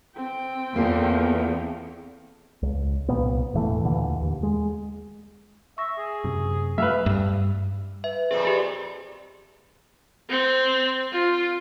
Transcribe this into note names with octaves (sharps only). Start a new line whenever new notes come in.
C4 G5
E2 A#3 F4 A4
C#2
C2 G2 A#2 B3
E1 A2 E3 A3
D#2 A#2 D3 E3
D#2
G#3
E5 C#6 A#6
G#4
F#2 C3
G2 F#3 A3 B4 E5 F5
G2
B4 E5
F2 A#2 C4 G#4
G4 G#4
C4
F4